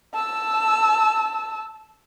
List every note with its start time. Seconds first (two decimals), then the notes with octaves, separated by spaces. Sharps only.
0.14 A5 E6